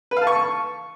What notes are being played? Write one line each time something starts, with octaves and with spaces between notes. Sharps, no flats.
B4
F5
A5
C#6